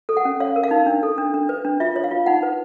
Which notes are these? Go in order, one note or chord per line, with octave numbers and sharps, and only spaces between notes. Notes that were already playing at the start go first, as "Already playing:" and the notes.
A4
F#5
C#4
C#5 F5
A#4
F5
D#4
D4
A4
D4
D4
B4
D4
F4 E5
C#5
F5
F4
D#4 F#5
B4